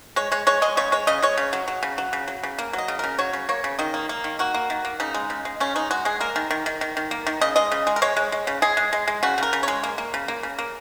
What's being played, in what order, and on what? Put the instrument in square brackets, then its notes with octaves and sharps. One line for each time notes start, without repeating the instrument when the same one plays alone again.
[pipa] G#3 C#5
G#3 C#5
G#3 C#5
G#3 D#5
C#3 C#5
G#3 C#5
C#3 D#5
G#3 C#5
C#3
F#3
F#3
C#3
F#3
C#3
F#3
C#3
A#3
F#3 D#5
C#3
C#3 A#4
F#3 C#5
C#3
A#3 C#5
C#3
D#3 D#5
A#3
A#3
D#3
A#3 F#4
A#3
D#3
A#3
C#3 D#4
G#3
C#3
G#3
C#3 C#4
G#3 D#4
G#3 F#4
G#3 G#4
A#3 A#4
D#3
D#3
D#3
D#3
D#3
A#3
D#3
C#3 D#5
G#3 D#5
C#3
G#3
A#4
G#3 C#5
G#3
G#3
C#3
G#3 G#4
G#3
G#3
G#3
C#3 F#4
C#3 A#4
C#3
G#3 C#5
A#3
A#3
C#3
A#3
C#3
A#3